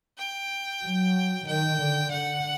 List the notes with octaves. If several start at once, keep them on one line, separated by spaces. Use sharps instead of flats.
G5
F#3
D#3 G5
D3
D3 F#5